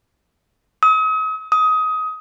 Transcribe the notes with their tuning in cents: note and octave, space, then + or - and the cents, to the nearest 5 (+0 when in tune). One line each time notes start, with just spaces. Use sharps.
D#6 +40
D#6 +20